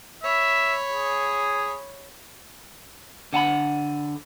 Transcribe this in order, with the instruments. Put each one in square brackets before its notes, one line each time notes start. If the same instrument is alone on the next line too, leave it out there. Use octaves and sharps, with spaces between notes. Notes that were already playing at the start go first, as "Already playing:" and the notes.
[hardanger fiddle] C#5 B5 [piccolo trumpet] E5
[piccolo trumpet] G#4
[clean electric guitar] D3 F#5 A5 B5